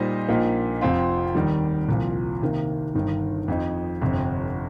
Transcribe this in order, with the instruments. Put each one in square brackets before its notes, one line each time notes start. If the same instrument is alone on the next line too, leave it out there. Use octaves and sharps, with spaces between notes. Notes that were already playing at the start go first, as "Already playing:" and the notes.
Already playing: [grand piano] A#2 G3 D#4 C5 D#5
A#1 A#2 A#3 D#4
F1 F2 F3 C4 F4
D#2 D#3 G3
C2 A#2 F3
C3 D#3 A#3
G1 G2 D#3
F2 F3 D#4
G1 F2 C3